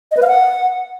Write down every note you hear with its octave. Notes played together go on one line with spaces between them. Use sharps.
D#5
B4
F5
F#5